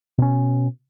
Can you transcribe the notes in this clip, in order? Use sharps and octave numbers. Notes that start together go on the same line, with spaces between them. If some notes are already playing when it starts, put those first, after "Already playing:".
B2 C#4